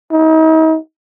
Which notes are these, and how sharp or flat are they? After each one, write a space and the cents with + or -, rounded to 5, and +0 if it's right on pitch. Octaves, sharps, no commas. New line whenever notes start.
D#4 +40